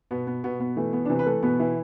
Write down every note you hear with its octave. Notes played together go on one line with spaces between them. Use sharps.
B2 B3
B3
B2 B3
B3
E3 A3
B3
D4
C3 E3 C4
B4
A3 A4
B2 B3 B4
E3 E4